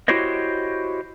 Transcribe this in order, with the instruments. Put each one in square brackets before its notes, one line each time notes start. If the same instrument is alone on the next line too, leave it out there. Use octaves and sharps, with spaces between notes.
[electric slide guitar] E4 F#4 G4 C5 C#5 D#5